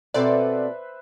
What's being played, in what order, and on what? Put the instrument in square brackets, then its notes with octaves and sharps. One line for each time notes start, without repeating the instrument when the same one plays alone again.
[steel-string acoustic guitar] B2 C4 A4 [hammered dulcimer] B4 C5 E5 [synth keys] D5